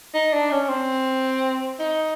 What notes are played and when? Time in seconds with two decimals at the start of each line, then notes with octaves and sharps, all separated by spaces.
0.14 D#4
0.33 D4
0.51 C#4
0.69 C4
1.79 D#4